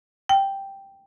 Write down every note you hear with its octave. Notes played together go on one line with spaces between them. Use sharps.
G5